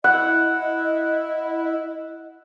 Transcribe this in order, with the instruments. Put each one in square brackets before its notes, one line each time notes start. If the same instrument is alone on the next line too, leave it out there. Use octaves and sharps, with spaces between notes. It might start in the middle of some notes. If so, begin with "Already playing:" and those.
[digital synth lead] E4 [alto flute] D#5 [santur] F#5